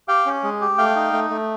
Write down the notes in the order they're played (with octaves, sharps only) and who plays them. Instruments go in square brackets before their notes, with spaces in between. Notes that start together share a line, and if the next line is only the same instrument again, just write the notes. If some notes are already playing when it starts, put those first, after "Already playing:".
[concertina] G4 F5 G5
C#4
G#3
G4
A3 F5 G5
D#4
A3
A3